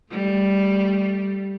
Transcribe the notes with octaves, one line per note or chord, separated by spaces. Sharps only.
G3 A3